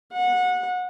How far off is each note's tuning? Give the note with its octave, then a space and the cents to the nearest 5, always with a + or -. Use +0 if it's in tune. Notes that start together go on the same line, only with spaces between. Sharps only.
F#5 -25